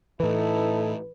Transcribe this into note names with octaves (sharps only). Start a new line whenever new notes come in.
A2 E3 D#4 E4 A4 B4